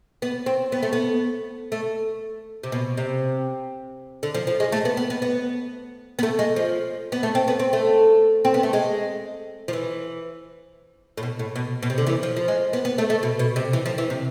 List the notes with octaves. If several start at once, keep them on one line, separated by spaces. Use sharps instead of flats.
B3
C4
B3
A3
B3
A3
C3
B2
C3
D3
F3
F3
G#3
A3
B3
B3
B3
B3
B3
A3
G#3
F3
B3
A3
C4
B3
C4
A3
C4
B3
A3
G#3
F3
E3
A2
B2
A2
B2
B2
C3
D3
E3
F3
F3
G#3
B3
B3
A3
A3
B2
B2
C3
E3
F3
E3
C3